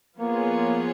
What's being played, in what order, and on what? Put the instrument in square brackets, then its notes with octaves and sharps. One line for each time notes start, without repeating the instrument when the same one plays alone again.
[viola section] F3 B3 F4 G#4 C#5 [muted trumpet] A#3